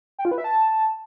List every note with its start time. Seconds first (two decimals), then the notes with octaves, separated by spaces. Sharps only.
0.19 G5
0.25 F4
0.31 B4
0.38 E5
0.44 A5